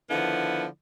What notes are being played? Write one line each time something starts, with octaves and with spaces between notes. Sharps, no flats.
D3 D#3 F3 B3 E4